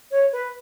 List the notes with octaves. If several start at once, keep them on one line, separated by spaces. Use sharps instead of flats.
C#5
B4